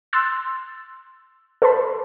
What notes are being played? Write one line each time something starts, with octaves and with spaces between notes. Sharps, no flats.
C6 E6 F#6 A6
A4 B4 C5 A5 B5